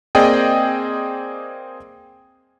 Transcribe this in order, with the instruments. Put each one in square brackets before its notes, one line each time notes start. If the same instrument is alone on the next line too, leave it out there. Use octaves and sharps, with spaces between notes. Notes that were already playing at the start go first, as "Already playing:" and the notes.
[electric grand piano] A#3 C4 G#4 D5 D#5 G5